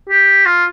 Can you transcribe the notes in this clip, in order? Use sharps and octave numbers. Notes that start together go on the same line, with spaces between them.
G4
F4